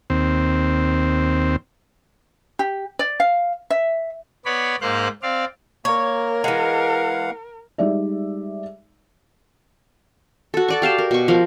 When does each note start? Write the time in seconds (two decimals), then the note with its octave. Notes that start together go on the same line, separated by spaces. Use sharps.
0.10 D#2 C4
2.59 G4
2.99 D5
3.20 F5
3.70 E5
4.45 B3 C#5 D5 B5
4.81 G#2 A#3 C5 F5 F#6
5.23 C4 D5 F5
5.85 A#3 A#4 C#5
6.44 E3 G#3 F5 F#5
7.78 G3 G#3 D#4 D5 E5
10.54 F#4 A4
10.68 A4 D5 C#6
10.82 G4 F5 G5 A5
10.99 A#4
11.11 B2 C#6
11.28 F3 A#4